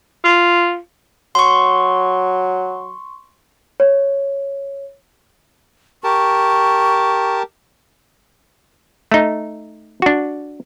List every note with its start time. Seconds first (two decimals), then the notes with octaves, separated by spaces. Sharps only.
0.24 F4
1.35 F#3 C6 C#6
3.80 C#5
6.04 G4 A#4 A5 C#6
9.12 A3 D#4
10.02 D4 F#4